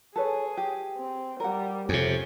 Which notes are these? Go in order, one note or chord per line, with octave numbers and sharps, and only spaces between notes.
G#4 A4 B4 C#5
G4
C4
G3 A#4 F#5
F2 C3 C#4 G#4